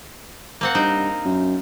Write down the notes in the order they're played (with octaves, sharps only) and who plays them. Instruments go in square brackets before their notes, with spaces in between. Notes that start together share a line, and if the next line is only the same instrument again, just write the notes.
[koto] A#3 C4 F#5
[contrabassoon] G2 [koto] D#4 A#4 C5
[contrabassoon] F#2